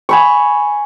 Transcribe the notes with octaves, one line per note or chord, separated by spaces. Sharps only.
G#5 B5 C#6